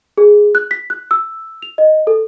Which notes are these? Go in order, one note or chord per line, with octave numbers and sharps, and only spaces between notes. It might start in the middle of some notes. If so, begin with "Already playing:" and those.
G#4
F#6
B6
F#6
E6
F7
D#5
A4